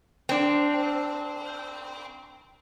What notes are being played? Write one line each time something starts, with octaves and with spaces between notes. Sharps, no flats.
C4 D4